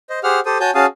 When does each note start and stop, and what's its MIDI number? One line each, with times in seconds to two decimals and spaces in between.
0.10 0.19 72
0.10 0.19 75
0.24 0.40 67
0.24 0.40 68
0.24 0.40 72
0.24 0.40 78
0.24 0.40 89
0.46 0.58 67
0.46 0.58 69
0.46 0.58 72
0.46 0.58 87
0.60 0.71 66
0.60 0.71 73
0.60 0.71 80
0.60 0.71 81
0.60 0.71 91
0.75 0.86 61
0.75 0.86 66
0.75 0.86 68
0.75 0.86 77
0.75 0.86 81
0.75 0.86 87